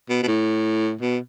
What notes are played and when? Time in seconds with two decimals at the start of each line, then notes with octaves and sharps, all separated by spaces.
0.10 B2
0.23 B2
0.27 A2
1.01 B2